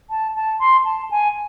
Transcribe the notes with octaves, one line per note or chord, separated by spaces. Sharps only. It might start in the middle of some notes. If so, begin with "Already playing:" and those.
A5
A5
C6
A5
G#5